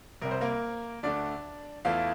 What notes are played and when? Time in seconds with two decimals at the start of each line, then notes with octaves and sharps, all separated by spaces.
0.22 C2 C3 G3 A#4
0.31 C5
0.41 A#3 A#4
1.03 D2 D3 A3 D4 D5
1.85 E2 E3 A3 F4 F5